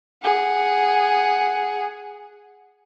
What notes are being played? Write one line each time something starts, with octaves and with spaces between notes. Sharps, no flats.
G#4 F#5